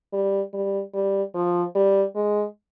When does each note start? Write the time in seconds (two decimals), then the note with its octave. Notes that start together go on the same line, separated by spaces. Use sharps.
0.13 G3
0.53 G3
0.94 G3
1.35 F3
1.75 G3
2.16 G#3